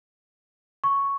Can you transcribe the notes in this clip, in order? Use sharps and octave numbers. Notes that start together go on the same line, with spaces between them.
C#6